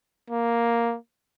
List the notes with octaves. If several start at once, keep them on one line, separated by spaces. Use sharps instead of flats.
A#3